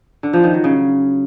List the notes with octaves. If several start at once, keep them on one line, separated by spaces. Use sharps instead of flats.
D3
F3
D#3
F#3
C#3